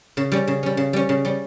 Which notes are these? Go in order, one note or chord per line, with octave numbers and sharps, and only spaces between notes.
C#3
G3 C#4
C#3
G3 C#4
C#3
G3 C#4
C#3
G3 C#4